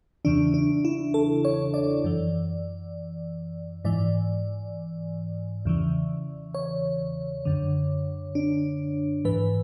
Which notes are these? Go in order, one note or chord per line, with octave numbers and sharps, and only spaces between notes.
E2 C#3 E3 D4
D4
E4
A4
C#5
D5
F#2 E3
G#2 E3 D5
E2 C#3 E3
C#5
F#2 D3
D4
G#2 E3 B4